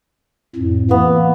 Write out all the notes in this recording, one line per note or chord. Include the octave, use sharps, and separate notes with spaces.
F2 A2
E3 A#3 B3